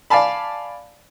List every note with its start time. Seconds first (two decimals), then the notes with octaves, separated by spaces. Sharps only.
0.10 D5 F5 G#5 A5 B5